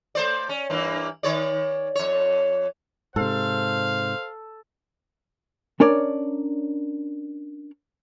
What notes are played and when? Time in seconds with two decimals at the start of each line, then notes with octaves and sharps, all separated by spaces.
0.15 A3 C5 D5
0.49 C#4
0.70 G2 E3 A#3
1.23 D#3 C#5 D5
1.95 F2 C#5
3.16 G#2 C3 A4 C5 F5
5.80 C#4 D4 A#4 C#5 D5